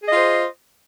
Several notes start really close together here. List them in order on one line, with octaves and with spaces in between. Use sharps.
G#4 D#5 F4 C5